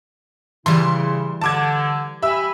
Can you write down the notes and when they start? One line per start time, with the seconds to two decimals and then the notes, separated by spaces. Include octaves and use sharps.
0.66 C#3 E3 G3 E4 C6
1.41 D3 A5 D6 G#6
2.23 G4 E5 G#5 B5 E6